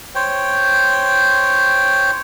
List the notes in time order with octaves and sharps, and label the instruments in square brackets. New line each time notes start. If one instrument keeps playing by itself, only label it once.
[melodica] C5 C#5 G5